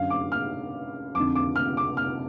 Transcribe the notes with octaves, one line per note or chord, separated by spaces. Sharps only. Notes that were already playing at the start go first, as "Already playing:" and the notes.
Already playing: F#2 D3 F5
D6
F6
F2 D3 D6
D6
F6
D6
F6